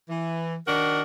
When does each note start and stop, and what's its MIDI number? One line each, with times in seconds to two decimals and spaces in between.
0.09 0.56 52
0.67 1.02 51
0.67 1.02 62
0.67 1.02 66
0.67 1.02 70